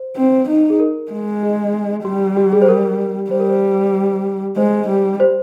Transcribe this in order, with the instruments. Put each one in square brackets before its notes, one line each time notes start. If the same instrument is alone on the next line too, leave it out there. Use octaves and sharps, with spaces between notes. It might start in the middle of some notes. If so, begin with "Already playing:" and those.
Already playing: [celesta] C5
[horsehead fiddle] C4
D#4
[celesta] G#4
A#4
[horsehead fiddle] G#3
[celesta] G#4
[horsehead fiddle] G3 [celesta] G4
[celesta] G4
G#4
C5
A#4
[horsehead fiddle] G3 [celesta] C5
[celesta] A#4
C5
[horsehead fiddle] G#3 [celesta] C5
[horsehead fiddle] G3
[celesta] C5